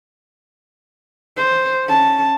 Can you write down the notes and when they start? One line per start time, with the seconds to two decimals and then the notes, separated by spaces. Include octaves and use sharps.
1.37 C5
1.85 C#4 A5